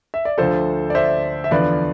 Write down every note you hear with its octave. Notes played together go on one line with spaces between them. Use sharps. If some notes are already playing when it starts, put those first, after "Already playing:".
E5
D5
D2 D3 F3 A4 C5
D5
C5 E5
E5
E2 D3 F3 B4 D5